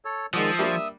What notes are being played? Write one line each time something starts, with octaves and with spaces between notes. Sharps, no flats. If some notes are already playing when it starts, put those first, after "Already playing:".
A4 C#5
D#3 F3 G#3 D5 F#5 D#6 E6
G3 A#3 D4 E5